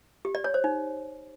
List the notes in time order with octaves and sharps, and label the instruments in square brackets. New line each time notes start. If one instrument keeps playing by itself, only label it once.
[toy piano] G4
D5
C#5
C5
D#4